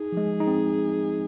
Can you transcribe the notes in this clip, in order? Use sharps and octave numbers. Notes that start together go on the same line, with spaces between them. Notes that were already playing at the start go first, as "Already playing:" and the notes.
Already playing: D#4 G#4
F3
G#3
D#4
C4